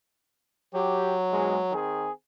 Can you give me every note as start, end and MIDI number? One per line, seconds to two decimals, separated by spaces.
0.74 1.73 54
0.74 1.13 67
1.31 1.57 44
1.31 1.57 47
1.31 1.57 56
1.71 2.10 51
1.71 2.10 60
1.71 2.10 68